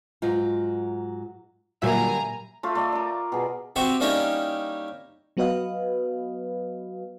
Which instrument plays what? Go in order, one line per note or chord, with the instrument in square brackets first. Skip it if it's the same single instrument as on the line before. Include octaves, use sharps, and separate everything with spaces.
[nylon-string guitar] G#2 F#3 F4
[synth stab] A#2 F#3 E5 [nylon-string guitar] D3 G3 A#3 [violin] G#5 A#5
[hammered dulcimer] A3 F4 E5 A5
A3 D5 D#5
A#4 D5
B2 G#4
[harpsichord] C4 F#4 G4 E5 F#5
G3 A#3 C#4 D#4 E4 G4
[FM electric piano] F#3 B3 F#4 B4 D#5 F5